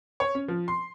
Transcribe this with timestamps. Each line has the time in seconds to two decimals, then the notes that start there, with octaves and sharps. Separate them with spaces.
0.20 C#5
0.35 C#4
0.48 F3
0.68 C6